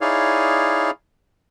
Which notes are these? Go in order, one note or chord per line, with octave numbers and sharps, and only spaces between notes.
D#4 E4 G#4 C#5 D5 F5